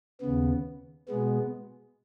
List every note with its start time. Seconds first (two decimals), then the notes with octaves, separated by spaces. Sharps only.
0.21 D#2 C#3 B3
1.08 B2 G#3 B3